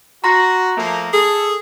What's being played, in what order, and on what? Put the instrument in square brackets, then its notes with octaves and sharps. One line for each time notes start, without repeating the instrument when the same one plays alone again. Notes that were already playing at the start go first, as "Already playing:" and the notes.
[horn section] F#4 [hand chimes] A#5 C6 A#6
[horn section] F3 A3 A#3
[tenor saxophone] G#4 [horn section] A4